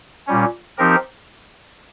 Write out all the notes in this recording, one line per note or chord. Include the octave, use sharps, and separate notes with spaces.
A#2 G3 C#4
F3 C4 D#4 G4 A#4